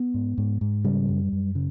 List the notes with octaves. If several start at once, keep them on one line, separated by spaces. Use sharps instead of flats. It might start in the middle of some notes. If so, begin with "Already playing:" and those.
Already playing: B3
G#2
G#2
G#2
C#3 G3
F#2
F#2
C#3